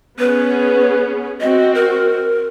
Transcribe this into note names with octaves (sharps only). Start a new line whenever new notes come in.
B3 C#4 G#4 B4
C4 F#4 D#5
A#4